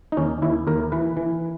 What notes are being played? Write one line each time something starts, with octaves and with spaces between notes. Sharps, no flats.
D#4
D#2 C#4
D#2 E4
D#2 A#4
E3 B4
E3